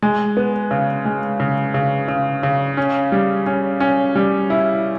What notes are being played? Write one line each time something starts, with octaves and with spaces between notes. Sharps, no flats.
G#3
B3
C#3
G#3
C#3
C#3
C#3
C#3
C#4
G3
C#4
C#4
G3
E4